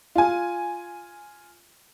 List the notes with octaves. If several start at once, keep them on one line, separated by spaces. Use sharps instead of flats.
F4 G#5